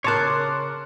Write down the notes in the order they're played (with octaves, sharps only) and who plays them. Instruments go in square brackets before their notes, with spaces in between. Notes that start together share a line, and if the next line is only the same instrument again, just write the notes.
[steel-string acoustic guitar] C#3 A#4 [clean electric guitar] C#5 A5 [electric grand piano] C6 D6 F#6